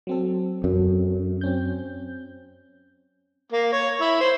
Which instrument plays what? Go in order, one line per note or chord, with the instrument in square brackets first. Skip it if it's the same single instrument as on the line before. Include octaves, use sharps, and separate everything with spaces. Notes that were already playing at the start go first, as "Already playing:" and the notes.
[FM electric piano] F#3 C4 A4
[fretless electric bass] F#2
[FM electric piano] C4 C#4 G6
[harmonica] A#3
C#5
E4
C5